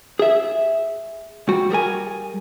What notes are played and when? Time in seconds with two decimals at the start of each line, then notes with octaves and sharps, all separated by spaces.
0.19 G#4 E5
1.49 G3 F#4
1.70 G3 G#4 A#4 G#5